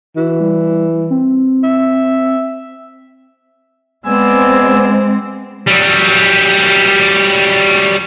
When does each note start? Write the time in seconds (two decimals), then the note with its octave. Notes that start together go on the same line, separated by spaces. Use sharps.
0.17 E3 F#4
0.40 G3
1.10 C4
1.64 E5
4.06 G#3 B3 C4 D5 G#5 E6
5.68 F#3 G3